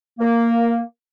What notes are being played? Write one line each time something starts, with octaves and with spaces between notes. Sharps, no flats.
A#3